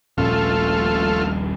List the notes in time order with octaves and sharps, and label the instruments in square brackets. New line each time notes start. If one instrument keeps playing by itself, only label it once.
[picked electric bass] D#1 A#1 C#4 [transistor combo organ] A3 F4